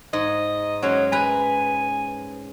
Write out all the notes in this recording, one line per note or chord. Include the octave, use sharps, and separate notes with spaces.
G#2 D#5
F#3 G#3 C#4
B4 G#5 A#5